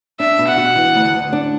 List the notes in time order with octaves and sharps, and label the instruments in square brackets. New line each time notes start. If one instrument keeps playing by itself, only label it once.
[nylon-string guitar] D4 [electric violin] E5
[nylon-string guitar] B2
[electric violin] F#5
[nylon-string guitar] F#4
E3
D2
D2
D4